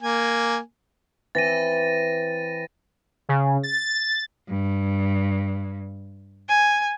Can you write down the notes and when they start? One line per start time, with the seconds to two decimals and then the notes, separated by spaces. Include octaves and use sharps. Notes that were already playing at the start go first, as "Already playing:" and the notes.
0.02 A#3 G#5
1.35 E3 C4 A6 A#6 D#7
3.29 C#3
3.63 A6
4.49 G2
6.49 G#5